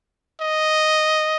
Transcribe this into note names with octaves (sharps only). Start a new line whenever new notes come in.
D#5